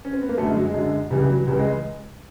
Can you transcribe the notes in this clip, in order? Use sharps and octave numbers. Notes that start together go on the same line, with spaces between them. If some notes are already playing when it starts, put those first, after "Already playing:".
C#4
C4
B3
A#3
F#2 D3 A3
G#3
F#3
G#3
F#2 D3
C#2 C#3 E3 G3
F#3
C#2 C#3 E3 G3
G#3